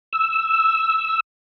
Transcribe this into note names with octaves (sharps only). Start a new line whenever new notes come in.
E6